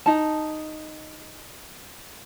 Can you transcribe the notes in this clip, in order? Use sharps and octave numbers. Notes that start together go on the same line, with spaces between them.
D#4 A5